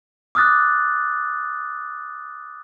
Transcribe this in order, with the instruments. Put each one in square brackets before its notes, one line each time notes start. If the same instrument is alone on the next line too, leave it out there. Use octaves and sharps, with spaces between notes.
[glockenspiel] D6 D#6 F6 F#6 A6